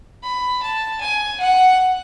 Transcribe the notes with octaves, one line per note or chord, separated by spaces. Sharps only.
B5
A5
G#5
F#5